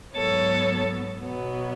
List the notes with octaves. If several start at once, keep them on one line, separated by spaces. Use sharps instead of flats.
G#2 F#3 B3 A4 C#5
B2 F#3 B3